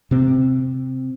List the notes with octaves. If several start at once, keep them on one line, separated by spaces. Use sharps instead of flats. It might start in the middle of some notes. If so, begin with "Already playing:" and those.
C3 C4